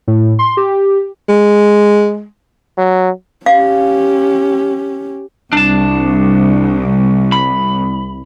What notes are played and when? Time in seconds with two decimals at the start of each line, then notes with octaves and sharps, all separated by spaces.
0.08 A2
0.39 C6
0.57 G4
1.29 G#3
2.78 F#3
3.46 C#4 G4 F5
5.53 C2 D4 A5
7.32 B5